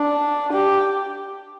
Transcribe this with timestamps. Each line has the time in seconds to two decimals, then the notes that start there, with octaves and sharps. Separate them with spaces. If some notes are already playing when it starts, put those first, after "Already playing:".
Already playing: D4
0.53 G4